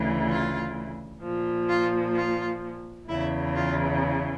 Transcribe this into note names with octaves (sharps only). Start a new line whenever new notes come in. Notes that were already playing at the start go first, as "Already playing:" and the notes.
Already playing: D2 C#3 E3
F4
A#2 F3
F4
F4
E2 C#3 E3 E4
F4